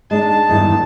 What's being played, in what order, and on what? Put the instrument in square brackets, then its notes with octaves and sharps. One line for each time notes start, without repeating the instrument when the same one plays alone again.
[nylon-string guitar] G#3 D4 D#4 [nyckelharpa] A5
[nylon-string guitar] E2 G2 D#3